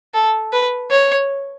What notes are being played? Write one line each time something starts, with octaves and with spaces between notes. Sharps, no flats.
A4
B4
C#5